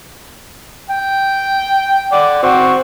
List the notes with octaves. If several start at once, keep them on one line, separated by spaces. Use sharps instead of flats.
G5
D5 F#5
C4 F#4